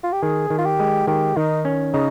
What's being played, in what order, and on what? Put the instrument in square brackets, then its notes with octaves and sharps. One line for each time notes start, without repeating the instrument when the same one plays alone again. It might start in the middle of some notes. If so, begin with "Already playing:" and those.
[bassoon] F4
G4
[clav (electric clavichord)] D#3 [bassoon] G#4
[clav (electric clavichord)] D#3
[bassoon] F4
G4
[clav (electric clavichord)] G#3
[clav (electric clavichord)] D#3 [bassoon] G4
[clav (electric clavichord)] D#3 [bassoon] D#4
[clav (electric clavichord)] C#4
[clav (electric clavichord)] C#3 [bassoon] D#4